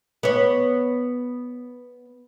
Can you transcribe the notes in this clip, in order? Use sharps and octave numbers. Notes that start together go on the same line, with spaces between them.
B3 C#5